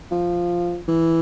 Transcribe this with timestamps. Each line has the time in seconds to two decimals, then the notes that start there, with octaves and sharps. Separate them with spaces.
0.11 F3
0.88 E3